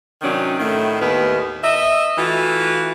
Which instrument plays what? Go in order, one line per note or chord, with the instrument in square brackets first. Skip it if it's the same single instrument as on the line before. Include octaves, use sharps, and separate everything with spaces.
[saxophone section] C3 D#3 F#3 C#4 D4
A2 D#3 A3
D#2 A2 D#3 B3 B4
D#5 E5
E3 A3 F4 F#4